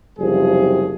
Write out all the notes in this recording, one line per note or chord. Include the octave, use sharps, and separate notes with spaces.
F#1 C3 F3 G3 G#4